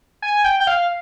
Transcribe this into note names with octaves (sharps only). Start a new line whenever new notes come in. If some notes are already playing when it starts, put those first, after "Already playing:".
G#5
G5
G5
F5